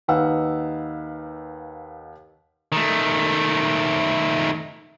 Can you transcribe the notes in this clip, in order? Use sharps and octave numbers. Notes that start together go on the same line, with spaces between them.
D#2 D#4 B4 F5 F#5 E6
D#3 A3